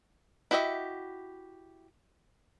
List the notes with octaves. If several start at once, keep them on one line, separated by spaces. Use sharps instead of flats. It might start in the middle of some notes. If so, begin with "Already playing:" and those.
E4 F#4 G4 D#5 E5